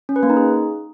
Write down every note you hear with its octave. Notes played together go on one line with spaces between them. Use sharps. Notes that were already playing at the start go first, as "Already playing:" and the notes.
C#4
B4
A#3
D#4
G#4